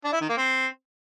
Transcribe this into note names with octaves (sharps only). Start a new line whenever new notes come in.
D4
E4
D#3
A#3
C4